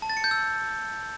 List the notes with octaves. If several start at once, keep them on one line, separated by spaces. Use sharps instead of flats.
A5
A6
C#7
G6
E6